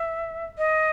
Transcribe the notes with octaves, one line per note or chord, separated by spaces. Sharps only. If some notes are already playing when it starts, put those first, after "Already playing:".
Already playing: E5
D#5